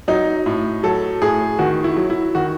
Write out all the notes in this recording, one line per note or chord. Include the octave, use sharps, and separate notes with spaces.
F#3 D#4
A2
F#3 A4
A2 G#4
D#3 F#4
E4
F#3
E4
D#3 F#4